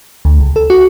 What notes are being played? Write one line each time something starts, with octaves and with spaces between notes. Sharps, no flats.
D2
C#2
A4
F#4